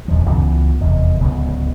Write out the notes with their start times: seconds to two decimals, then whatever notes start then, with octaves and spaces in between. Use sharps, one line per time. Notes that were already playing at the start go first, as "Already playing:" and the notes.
0.08 D#1 E2 F3
0.30 C#2 E3 G3 B3
0.81 F1 E2
1.20 D1 C#2 C#3 B3